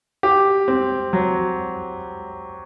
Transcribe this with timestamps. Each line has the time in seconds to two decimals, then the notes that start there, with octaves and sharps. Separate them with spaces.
0.23 G4
0.68 C4
1.13 F#3